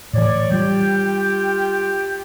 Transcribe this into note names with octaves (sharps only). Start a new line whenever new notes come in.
A2 E3 C#5 D5
G3 F4 G4 G5